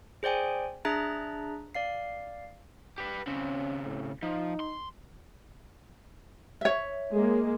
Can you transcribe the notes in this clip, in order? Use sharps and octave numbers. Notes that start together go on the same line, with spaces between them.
G#4 C5 D5 G5 G#5
D4 G#4 E5 A#5 F#6 A6
D5 F5 C7
G4 B4
C#3 C4 C#4
A2
F3 D#4
C6
C#5 E5
G#3 A#3